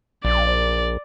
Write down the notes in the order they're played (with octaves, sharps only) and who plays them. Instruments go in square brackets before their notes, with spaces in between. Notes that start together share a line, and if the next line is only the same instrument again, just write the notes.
[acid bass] A#1 [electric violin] D5